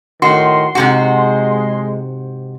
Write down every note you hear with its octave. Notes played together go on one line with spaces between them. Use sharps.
A2 D#3 F#4 C6
G#2 C3 G#3 F#4